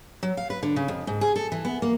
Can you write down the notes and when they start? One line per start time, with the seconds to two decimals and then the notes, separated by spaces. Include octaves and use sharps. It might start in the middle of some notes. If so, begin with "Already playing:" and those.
0.23 F#3
0.37 F5
0.50 B4
0.63 D3
0.76 C#3
0.88 F2
1.07 G#2
1.21 G#4
1.36 A4
1.52 E3
1.65 B3
1.82 A#3